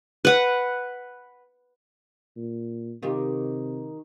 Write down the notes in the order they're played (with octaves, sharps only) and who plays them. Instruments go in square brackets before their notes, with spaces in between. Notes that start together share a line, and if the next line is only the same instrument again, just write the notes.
[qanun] B4 F#5
[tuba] A#2
[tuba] C3 [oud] D#3 F4 G4